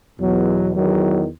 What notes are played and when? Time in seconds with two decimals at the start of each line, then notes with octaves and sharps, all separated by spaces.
0.19 E2 B2 F#3
0.73 E2 D#3 F#3